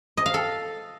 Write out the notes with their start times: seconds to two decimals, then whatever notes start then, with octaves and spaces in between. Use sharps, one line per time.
0.17 D#5
0.26 F5
0.34 A4